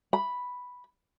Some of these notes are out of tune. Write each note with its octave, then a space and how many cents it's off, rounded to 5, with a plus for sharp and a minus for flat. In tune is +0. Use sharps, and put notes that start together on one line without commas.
B5 +0